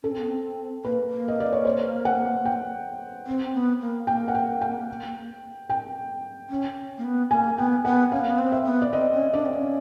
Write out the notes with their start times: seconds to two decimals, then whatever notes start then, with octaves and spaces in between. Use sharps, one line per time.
0.03 C#4 A4
0.12 C4
0.19 B3
0.28 C4
0.84 A#3 B4
1.10 A#3
1.28 D#5
1.40 D5
1.52 C#5
1.65 C5
2.05 F#5
2.45 G5
3.27 C4
3.54 B3
3.81 A#3
4.07 A#3 G5
4.28 F#5
4.35 G5
4.61 G5
5.70 G5
6.50 C#4
6.98 A#3
7.04 B3
7.31 A#3 G#5
7.57 B3 G5
7.85 B3 F#5
8.12 C#4 F5
8.21 A#3
8.30 B3
8.38 C4
8.52 E5
8.65 B3
8.82 D5
8.93 C4 D#5
9.13 C#4
9.33 D4 D5
9.46 C4
9.54 C#4